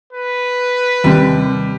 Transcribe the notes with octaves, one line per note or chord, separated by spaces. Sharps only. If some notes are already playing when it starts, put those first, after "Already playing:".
B4
D#2 C3 G3